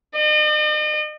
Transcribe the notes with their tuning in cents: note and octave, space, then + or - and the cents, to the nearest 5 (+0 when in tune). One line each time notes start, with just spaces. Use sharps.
D#5 -45